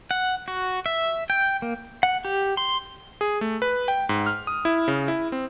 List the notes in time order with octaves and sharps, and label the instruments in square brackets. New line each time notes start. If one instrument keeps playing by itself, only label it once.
[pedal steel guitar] F#5
F#4
E5
G5
A#3
F#5
G4
C6
[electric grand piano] G#4
A3
B4
G5
G#2
F6
D#6
E4
C#3
E4
C4